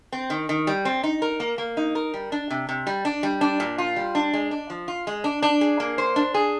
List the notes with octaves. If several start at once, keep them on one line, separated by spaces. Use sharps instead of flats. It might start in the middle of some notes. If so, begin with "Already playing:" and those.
C4
D#3
D#3
G3
C4
D#4
A#4
A#3
A#3
D#4
A#4
G3
D4
C3
C3
G3
D4
G3
D4
A#2
F4
G3
D4
G#3
D4
F3
F4
G#3
D4
D4
G#4
A#3
C5
D4
G#4